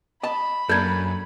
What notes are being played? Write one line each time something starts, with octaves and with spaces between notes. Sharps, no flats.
D#5 A5 B5
F#2 A#3 D4 A4 G6 G#6